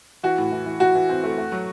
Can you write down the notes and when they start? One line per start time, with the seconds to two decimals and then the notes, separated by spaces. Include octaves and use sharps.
0.23 E3 F#4
0.38 A2
0.52 E3
0.66 E3
0.80 E3 F#4
0.95 E3
1.09 C4
1.24 A3
1.38 A3
1.52 F#3